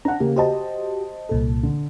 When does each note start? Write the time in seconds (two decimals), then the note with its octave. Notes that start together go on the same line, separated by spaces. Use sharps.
0.05 D4 F#5 A#5
0.20 C#3 A#3 G4
0.36 F#4 G4 C5 D#5 A5
1.29 C2 A#2 A4
1.63 D3